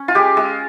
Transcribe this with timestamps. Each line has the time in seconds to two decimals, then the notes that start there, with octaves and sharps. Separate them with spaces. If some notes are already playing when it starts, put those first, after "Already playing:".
Already playing: C#4
0.08 F4
0.15 G#3 G4
0.37 G#3